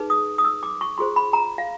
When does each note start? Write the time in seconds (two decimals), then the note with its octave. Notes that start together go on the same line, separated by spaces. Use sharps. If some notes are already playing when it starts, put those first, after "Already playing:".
Already playing: D#4 G#4 B4
0.10 D#6
0.38 D#6
0.45 E6
0.63 D6
0.81 C#6
0.98 F4 G#4 C5 C6
1.16 B5
1.33 A#5
1.58 F5